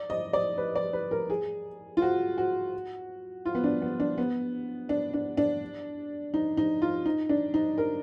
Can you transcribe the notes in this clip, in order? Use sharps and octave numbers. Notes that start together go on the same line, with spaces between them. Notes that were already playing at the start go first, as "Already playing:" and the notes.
Already playing: D5
D#5
D5
B4
D5
B4
A#4
G#4
F4
F#4
F#4
F4
B3
D4
B3
D4
B3
D4
D4
D4
D#4
D#4
F4
D#4
D4
D#4
A#4